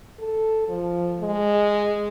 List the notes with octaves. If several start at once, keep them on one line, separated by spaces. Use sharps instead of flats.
A4
F3
G#3